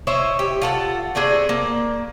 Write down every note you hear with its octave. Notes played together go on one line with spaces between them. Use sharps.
E4 C5 C#5 D#5
G4
F4 A4 F#5
A3 C4 D4 G#4
A#3